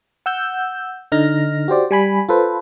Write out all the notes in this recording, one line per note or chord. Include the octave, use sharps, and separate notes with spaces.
F#5 E6 G6
D3 D#4 F6 A#6
F#4 G4 C5 D5
G3 G#5 B5
F4 A4 B4 C5